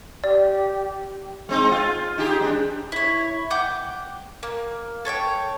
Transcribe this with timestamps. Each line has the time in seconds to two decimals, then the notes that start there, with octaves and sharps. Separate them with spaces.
0.24 G4 D5
1.49 G#3 C4 D#4
1.71 F4
2.18 D#4 G4 G#4
2.40 G3 B3 D4
2.92 E4 C#5
3.50 F#5 G5 D6 G6
4.43 A#3
5.05 A4 C#5 F5 G5